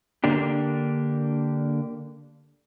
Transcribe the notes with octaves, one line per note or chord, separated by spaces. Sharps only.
D3 A#3 D4 G4